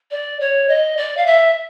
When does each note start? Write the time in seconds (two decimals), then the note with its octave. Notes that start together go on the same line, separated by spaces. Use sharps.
0.11 D5
0.40 C#5
0.69 D#5
0.97 D5
1.17 F5
1.26 E5